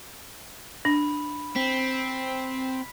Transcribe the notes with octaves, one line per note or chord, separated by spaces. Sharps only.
D4 B5
C4 B6